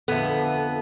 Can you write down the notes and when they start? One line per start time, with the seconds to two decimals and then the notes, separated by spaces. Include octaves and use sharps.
0.08 F2 D3 B3 A4 E5